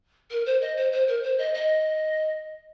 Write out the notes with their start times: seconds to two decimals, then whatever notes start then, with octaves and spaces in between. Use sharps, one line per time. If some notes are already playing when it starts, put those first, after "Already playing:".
0.31 A#4
0.46 C5
0.61 D#5
0.77 C5
0.92 C5
1.08 A#4
1.23 C5
1.38 D#5
1.54 D#5